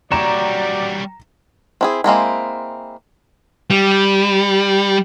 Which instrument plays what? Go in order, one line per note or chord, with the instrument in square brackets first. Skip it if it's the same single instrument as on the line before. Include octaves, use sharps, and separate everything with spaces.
[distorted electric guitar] G3 C#5 [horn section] F#4 G4 D5 [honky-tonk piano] A#5 E7
[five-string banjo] C4 E4 G#4
G#3 A#3 C4 E4
[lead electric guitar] G3